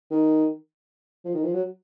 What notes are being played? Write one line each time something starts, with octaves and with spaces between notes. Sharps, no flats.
D#3
F3
D#3
F3
F#3